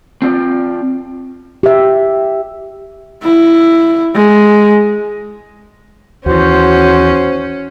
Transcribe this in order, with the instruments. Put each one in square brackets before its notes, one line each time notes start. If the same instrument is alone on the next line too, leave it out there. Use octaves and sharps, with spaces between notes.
[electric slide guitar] C4 F4 D5
[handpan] G4 E5
[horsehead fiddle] E4
G#3
[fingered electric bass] D#2 E3 [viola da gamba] C#4 [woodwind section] F#4 C5